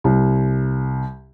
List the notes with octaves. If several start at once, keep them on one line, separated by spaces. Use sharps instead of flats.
C2